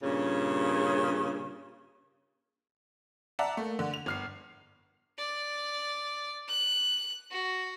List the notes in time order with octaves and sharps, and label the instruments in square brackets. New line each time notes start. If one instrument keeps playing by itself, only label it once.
[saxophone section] G2 A#2 C#3 C#4
[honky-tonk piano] D5 E5 F#5 A5 A#5
A3 A#3
D3
F7
G1 F6 C7
[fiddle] D5
F#6
F#4